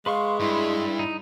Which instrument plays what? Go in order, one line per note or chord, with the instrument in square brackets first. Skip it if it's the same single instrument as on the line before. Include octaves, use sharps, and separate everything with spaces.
[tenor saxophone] G#3 [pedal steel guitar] B4 C6 C#6 [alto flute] F5
[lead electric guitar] G2 [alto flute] E4
[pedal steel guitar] D#4